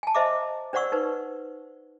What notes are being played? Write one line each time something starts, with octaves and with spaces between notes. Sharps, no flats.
G#5 A5
C5 D#5 E5 A#5 D6
D4 C5 D5 F#5 C#6 E6
D#4 B4 C5